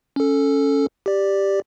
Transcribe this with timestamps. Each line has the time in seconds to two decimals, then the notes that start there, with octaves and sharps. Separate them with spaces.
0.16 C#4 A4
1.06 G4 D5